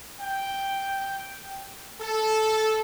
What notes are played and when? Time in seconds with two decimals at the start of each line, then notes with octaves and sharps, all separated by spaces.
0.21 G5
2.01 A4